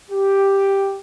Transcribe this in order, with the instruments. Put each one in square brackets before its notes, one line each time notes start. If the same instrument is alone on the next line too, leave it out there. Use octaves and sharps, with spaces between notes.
[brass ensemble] G4